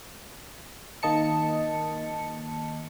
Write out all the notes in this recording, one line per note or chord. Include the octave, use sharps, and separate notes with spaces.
D#3 A#3 D#5 A5 C#7